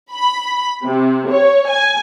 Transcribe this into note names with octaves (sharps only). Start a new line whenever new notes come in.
B5
C3
C#5
G#5